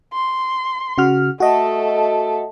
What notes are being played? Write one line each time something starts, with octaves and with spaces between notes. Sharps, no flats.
C6
C#3 F#4 F6
A3 F#4 A4 D#5